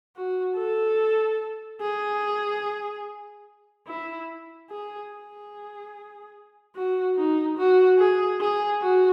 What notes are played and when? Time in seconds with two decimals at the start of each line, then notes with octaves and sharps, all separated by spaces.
0.16 F#4
0.57 A4
1.81 G#4
3.87 E4
4.70 G#4
5.11 G#4
6.76 F#4
7.17 D#4
7.58 F#4
7.99 G#4
8.40 G#4
8.82 F#4